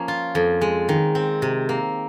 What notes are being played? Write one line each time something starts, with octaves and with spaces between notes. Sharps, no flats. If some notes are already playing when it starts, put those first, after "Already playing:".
Already playing: F3 A#3 C#4
F4
F2
G#3
D#3
C4
C3
A#3